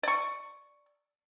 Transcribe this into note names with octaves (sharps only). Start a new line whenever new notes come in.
D5 C#6